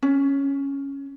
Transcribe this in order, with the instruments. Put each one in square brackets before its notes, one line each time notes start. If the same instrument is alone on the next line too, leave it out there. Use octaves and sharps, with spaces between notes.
[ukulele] C#4